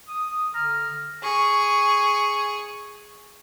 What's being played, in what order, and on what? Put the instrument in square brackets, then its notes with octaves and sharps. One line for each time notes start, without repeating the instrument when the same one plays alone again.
[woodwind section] D#6
D3 A#5 F6
[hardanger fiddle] G#4 C#6